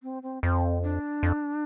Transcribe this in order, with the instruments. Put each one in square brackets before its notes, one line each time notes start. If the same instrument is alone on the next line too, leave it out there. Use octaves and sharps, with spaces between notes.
[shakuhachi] C4
C4
[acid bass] F2 [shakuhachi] C4
[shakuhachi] D4
[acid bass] F2